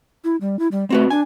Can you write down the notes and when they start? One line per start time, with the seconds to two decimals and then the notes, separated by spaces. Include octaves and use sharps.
0.24 E4
0.41 G3
0.59 E4
0.71 G3
0.90 A3 C4 F#4 B4
1.10 D4 G#5